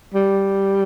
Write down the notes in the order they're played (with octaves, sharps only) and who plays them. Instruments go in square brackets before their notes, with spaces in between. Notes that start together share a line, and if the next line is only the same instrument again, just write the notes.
[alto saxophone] G3